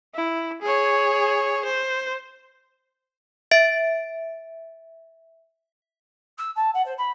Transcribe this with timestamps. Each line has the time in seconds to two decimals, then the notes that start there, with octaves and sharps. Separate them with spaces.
0.15 E4
0.62 G#4 C#5
1.65 C5
3.51 E5 A6 D7
6.38 E6
6.56 A5
6.74 F#5
6.85 C5
6.97 B5